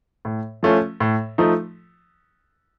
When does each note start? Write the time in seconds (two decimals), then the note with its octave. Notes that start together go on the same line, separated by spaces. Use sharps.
0.25 A2
0.63 F3 A3 C#4 F4
1.00 A2
1.38 F3 A3 D#4